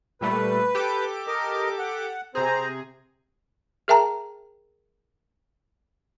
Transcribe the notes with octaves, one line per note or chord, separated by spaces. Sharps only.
A#2 G3 A3 B4
G4 A4 D6
A#4 D#5
F#5
C3 C4 G#4 C5 A#5
G#4 A#4 E5 G5 A5 A#5